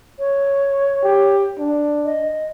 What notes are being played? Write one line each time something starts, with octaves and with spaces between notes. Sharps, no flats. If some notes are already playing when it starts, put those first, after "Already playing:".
C#5
G4
D4
D#5